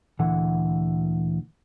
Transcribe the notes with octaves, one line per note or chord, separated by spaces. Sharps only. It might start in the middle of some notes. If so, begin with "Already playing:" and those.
D2 A#2 D3 E3 F#5